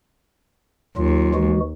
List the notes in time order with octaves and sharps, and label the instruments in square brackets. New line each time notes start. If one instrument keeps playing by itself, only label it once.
[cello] D#2 [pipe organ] F#3 F4
[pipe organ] E3 G#3 F#4